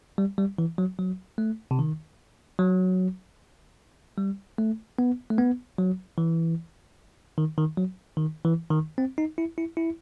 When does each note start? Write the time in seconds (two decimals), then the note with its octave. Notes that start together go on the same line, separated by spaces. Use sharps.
0.18 G3
0.38 G3
0.58 E3
0.78 F#3
0.99 F#3
1.38 A3
1.71 C3
1.79 D#3
2.59 F#3
4.18 G3
4.58 A3
4.99 B3
5.30 A3
5.38 B3
5.78 F#3
6.18 E3
7.38 D#3
7.58 D#3
7.77 F#3
8.17 D#3
8.45 E3
8.70 D#3
8.98 C4
9.18 D#4
9.38 E4
9.58 E4
9.77 E4